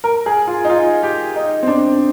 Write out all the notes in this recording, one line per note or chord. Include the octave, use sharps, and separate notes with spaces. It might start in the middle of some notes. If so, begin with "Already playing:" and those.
A#4
G#4
F4
D#4
F4
G4
D#4
C4
D4